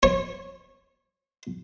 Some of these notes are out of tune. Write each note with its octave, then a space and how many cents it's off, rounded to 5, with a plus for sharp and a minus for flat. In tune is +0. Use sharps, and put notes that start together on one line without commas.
C#5 -25